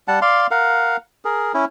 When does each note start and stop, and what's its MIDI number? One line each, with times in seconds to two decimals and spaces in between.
0.08 0.19 55
0.08 0.19 78
0.08 0.19 81
0.22 0.47 74
0.22 0.47 77
0.22 0.47 84
0.51 0.97 70
0.51 0.97 77
0.51 0.97 78
1.25 1.52 68
1.25 1.52 70
1.54 1.65 61
1.54 1.65 64